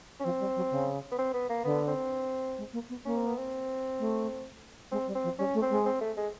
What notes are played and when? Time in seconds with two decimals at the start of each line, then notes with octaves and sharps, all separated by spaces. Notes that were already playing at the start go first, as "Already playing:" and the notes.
0.20 C#4
0.24 F3 C4
0.40 G3
0.56 F#3
0.71 C#3
1.12 B3
1.18 C4
1.34 B3
1.49 A#3
1.64 D3 B3
1.88 C4
2.57 G#3
2.73 A#3
2.89 B3
3.05 A#3 C#4
3.16 C4
3.27 B3
3.38 C4
3.99 A3
4.91 G#3 C4
5.07 G3
5.15 C4
5.24 F3
5.38 G3 C#4
5.54 A3
5.62 C4
5.69 G#3
5.85 C4
6.01 A3
6.17 G#3